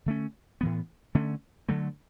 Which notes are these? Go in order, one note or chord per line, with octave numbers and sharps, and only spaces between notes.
D3 A3 C#4
A2 E3 B3
D3 A3 C#4
D3 F#3 A3